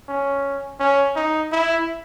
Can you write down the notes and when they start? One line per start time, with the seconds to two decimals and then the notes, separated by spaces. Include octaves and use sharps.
0.08 C#4
0.80 C#4
1.16 D#4
1.52 E4